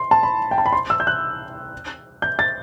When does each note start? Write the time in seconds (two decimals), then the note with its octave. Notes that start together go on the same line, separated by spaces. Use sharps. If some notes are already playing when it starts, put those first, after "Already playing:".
Already playing: C6
0.11 A5
0.23 B5
0.51 G5
0.58 A5
0.66 B5
0.73 C6
0.90 E6
1.00 G6
1.07 F#6
2.22 G6
2.39 A6